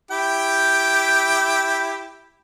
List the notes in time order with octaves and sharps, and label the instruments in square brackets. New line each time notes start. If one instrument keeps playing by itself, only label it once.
[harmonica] E4 G4 G5